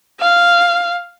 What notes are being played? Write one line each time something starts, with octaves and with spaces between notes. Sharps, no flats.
F5